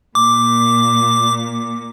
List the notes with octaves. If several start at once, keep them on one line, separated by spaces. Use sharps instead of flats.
A#2 D6